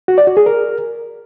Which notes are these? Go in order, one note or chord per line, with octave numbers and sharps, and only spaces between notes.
F#4
D5
F#4
G#4
A#4